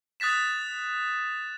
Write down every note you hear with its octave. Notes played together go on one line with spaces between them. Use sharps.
D#6 F#6 A6 B6 E7